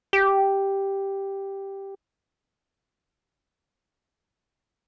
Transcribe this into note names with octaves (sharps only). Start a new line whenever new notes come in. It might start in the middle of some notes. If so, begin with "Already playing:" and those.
G4